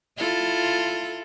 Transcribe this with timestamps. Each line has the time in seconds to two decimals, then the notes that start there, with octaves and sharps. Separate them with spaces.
0.18 E4 F4 A4